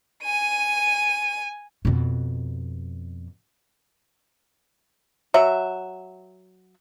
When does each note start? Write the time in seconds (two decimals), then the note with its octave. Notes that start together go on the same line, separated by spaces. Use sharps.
0.23 G#5 D#7
1.85 F2 B2
5.34 F#3 E5